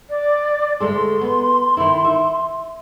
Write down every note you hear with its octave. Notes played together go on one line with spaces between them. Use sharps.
D5
D2 G#3 A4 C6
B3
D#3 E4
E5